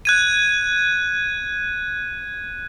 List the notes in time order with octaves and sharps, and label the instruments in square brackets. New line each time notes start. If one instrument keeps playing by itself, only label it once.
[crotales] F#6 G#6 D#7